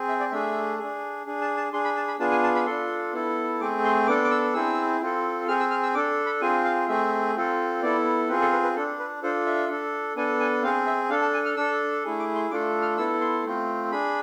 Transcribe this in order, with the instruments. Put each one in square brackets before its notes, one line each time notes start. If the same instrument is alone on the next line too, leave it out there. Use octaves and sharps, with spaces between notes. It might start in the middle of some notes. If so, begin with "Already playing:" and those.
Already playing: [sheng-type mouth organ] C4 G#4
E5
D5
A3 D4 G#4 E5
D4 G#4
D4 G#4
A5
A5
D4 G#4 C6
B5
A5
B5
B3 D4 F4 G#4 A5
G#5
A5
B5
D4 F4 A4 C6
B3 E4 A4
A3 C4 G#4 D6
C6
B3 D4 A4 D6
D6
E6
C4 E4 G#4 E6
C4 F4 A4
C4 G#4 F6
E6
F6
E6
D4 A4 D6
B5
C4 F4 G#4 G#5
F5
A3 C4 G#4 E5
C4 F4 A4
B3 E4 A4 D5
C4 F4 G#4 B4
A4
B4
B4
D4 A4
B4
D4 F4 A4 C5
E5
D4 A4
B3 D4 A4 G#5
G#5
C4 F5
G#4
E5
D4 A4 F5
A5
G#5
F6
D4 A4 E6
A3 E4 G#4
D6
C6
A3 D4 F4 A4 D6
F6
B3 E4 A4 E6
C6
A3 C4 F4
D4 G#4 B5